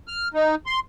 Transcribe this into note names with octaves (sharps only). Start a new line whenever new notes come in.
F6
D#4
C6